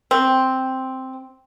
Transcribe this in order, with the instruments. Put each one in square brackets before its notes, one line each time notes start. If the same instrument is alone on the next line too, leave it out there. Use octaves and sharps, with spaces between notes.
[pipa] C4